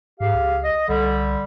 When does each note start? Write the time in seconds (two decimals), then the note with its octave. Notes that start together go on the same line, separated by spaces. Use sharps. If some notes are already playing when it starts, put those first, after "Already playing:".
0.20 G#2 G4 G#4 F5
0.34 C#2
0.64 D#5
0.89 C2 D3 G3